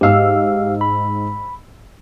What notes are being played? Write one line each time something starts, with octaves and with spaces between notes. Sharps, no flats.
G#2 G4 F5 E6
B5